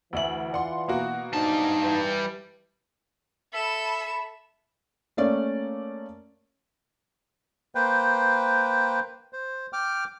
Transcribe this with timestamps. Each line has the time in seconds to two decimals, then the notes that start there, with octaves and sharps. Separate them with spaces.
0.13 D2 E3 E5 F#7
0.52 F4 D5 F#5 C6
0.88 B2 A#3 F#4
1.33 G#2 G3 D4 D#4 A5
1.82 E3 B4
3.53 A4 E5 B5 E7
5.17 A3 A#3 C#4 D5
7.75 A#3 B4 C5 G5
9.33 C5
9.73 G5 D6 F6